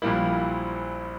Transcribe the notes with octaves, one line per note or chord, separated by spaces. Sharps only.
A#1 A#2 G3 A#3 E4